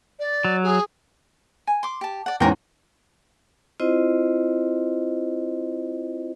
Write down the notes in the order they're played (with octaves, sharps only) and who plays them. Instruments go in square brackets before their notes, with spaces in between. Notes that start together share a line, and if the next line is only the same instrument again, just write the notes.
[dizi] D5
[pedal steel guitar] F#3
[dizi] G#4
[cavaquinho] G#5
C6 D6
G4 A5
D5 F#5
[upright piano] E2 G#2 C#4 [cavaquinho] G4 A#4 G5
[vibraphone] C4 E4 F4 C5 D#5